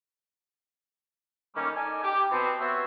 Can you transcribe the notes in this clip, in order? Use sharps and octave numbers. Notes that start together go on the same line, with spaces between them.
D#3 G3 A3 A#3 C#4
D#4 A4 D5 G#5
G4
B2 B3 C4
B3 C4 F#4 C5 C#5 E5